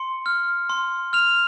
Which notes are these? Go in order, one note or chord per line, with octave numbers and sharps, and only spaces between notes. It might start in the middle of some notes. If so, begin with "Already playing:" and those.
Already playing: C6 C#7
F6
C6
F6 F7